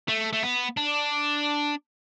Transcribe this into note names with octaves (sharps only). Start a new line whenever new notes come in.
A3
A3
B3
D4